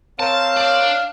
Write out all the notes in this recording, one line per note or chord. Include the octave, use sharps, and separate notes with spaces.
C4 A#4 C5 C#5 F5 A5
D4